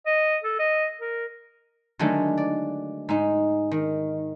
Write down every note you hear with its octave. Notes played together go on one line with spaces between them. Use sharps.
D#5
A4
D#5
A#4
D3 D#3 F#3 G#3 A3
D5
G#2 D#4
D#3